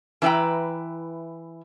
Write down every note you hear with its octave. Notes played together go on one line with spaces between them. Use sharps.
E3 E4 B4 G5 A#5